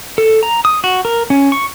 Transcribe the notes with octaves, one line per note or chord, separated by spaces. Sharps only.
A4
A#5
D#6
F#4
A#4
C#4
C#6